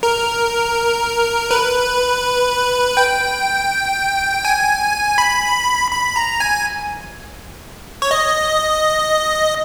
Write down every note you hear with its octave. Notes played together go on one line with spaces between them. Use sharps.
A#4
B4
G5
G#5
B5
B5
A#5
G#5
C#5
D#5